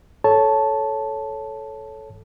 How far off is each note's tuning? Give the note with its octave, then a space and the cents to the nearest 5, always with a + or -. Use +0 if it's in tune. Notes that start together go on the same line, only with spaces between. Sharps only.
A4 -15 C#5 +0 A5 -5